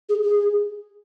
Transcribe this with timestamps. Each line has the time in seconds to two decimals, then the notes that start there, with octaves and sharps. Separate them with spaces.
0.09 G#4
0.22 G#4